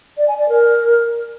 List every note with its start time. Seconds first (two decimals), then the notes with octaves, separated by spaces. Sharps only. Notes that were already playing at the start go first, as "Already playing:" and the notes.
0.17 D5
0.28 G#5
0.38 D5
0.49 A#4